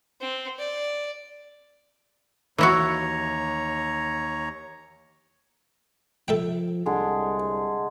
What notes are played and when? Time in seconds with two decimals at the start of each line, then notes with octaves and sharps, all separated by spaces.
0.21 C4
0.59 D5
2.58 D#2 E3 E4 F#4 C#5 A#5
6.28 F3 A4 E5 G5
6.86 C2 D3 G#3 G#4